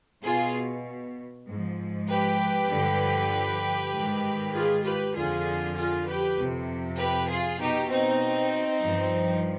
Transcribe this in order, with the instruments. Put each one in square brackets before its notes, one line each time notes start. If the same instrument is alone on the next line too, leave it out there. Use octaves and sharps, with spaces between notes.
[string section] B2 F4 G#4
G#2 F3
G4 B4
G2 D3 F3
G#2 D#3
F4 G#4
G4 B4
F2 D3 F3 F4 G#4
F4 G#4
G4 B4
F2 C3 F3
G4 B4
F4 G#4
B2 D#4 G4
C4 D#4
G2 F3